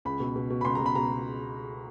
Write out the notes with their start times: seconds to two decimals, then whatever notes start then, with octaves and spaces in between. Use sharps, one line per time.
0.05 C#2 B5
0.20 B2
0.36 B2
0.50 B2
0.61 B5
0.65 C#2 C6
0.75 B2 A#5
0.86 B5
0.95 B2 A#5